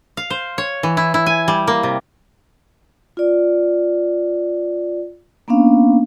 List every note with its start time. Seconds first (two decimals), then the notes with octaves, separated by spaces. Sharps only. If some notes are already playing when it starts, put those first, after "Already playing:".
0.17 F5
0.30 C5
0.58 C#5
0.83 E3
0.97 E4
1.14 E4
1.26 G#5
1.48 G3
1.68 A#3
1.83 C3
3.17 F4 D5
5.48 A#3 B3 C#4 D4 F5